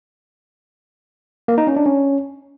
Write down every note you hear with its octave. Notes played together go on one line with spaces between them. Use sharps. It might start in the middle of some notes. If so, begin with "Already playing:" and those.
A#3
D#4
C#4
D4
C#4